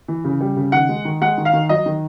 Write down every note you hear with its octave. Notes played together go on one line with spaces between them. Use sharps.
E3
C#3
G3
C#3
D#3 F#5
G#3
D#3
G#3 F#5
D#3
F5
D#3
F#3 D#5
D#3